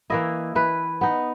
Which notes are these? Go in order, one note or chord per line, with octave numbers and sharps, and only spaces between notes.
E3 A#3 E4 D#5
E3 B4
B3 D#4